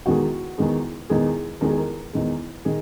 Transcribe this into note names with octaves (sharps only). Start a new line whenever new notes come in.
E2 D#3 G#3 F#4
E2 D#3 G#3
E2 D#3 G#3 G#4
E2 D#3 G#3 A#4
G#4
A#4
E2 D#3 G#3
D#3 G#4